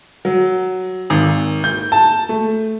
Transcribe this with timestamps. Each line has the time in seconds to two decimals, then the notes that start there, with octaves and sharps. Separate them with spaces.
0.25 F#3
1.10 G#1
1.64 G6
1.92 A5
2.29 A3